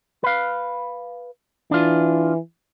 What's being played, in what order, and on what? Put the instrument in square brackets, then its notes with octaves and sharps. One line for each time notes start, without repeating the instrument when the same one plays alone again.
[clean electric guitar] B4 F5
[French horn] E3 [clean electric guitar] D4 F4